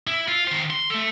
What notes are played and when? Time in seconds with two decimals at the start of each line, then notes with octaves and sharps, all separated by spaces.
0.07 E4
0.28 F4
0.47 D#3 C5
0.70 C6
0.90 A3 A4